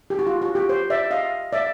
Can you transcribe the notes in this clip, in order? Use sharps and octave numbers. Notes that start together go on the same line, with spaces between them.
G4
F#4
F4
F#4
G4
C5
D5 E5
D#5 F5
D5 E5